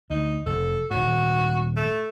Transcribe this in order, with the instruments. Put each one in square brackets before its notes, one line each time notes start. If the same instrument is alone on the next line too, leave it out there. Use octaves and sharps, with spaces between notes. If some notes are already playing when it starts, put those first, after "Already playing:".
[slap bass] D2 [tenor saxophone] D#4
[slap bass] F1 [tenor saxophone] A4
[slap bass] D#1 G#2 [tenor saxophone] F#4
[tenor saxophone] A3